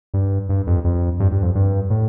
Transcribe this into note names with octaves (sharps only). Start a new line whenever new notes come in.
G2
G2
F2
F2
G2
G2
F2
G2
A2